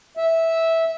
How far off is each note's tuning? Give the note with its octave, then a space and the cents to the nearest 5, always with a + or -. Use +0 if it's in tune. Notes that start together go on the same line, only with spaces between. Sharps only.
E5 -10